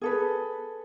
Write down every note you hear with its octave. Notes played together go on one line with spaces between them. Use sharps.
G#4 A4 B4